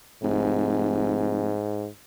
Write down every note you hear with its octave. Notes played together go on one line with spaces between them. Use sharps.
F1 G#2